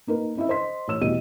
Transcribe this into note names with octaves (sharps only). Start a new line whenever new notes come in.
A#3 D#4 A#4 B4
C#4 E4 D#5 E5
C5 D#5 C6 B6
A1 C#5 E6 E7
E2 B2 G3 D#5 D#7